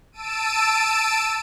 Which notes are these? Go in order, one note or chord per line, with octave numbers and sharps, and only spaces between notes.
A5 E6 D7 D#7